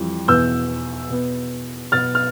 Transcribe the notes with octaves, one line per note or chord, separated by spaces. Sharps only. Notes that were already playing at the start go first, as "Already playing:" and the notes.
Already playing: F2 E3 G3
E2 B2 B3 E6 G6
B2 B3
B2 B3 F6 A6
F6